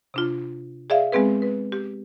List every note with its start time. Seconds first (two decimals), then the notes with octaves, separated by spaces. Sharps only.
0.14 C3 D4 F4
0.90 G#4 D5 E5 F5
1.12 G#3 B3 C4 G#4 B4
1.42 B4
1.72 G4